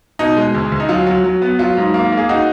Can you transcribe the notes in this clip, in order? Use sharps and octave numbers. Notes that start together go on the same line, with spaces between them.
B2 D#4
G#3
D2
D2
D#4
F#3 F4
F#3
F#3
B3
F#3 F4
G#2
A#3
A#3
G#4
D#4 F#4